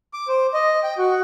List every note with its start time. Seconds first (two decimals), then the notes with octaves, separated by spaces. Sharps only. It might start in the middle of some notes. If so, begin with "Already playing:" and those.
0.14 D6
0.28 C5
0.54 D#5
0.83 G5
0.98 F#4